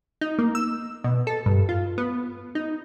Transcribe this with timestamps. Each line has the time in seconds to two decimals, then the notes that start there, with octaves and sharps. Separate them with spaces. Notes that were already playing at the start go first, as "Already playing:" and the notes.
0.21 D#4
0.38 A#3
0.55 E6
1.04 B2
1.27 A4
1.46 G2
1.69 F4
1.98 B3
2.55 D#4